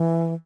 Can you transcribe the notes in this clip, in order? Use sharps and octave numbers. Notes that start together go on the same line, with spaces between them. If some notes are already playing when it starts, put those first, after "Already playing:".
Already playing: E3